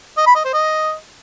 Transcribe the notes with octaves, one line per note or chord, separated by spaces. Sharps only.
D#5
B5
D#5
C5
D#5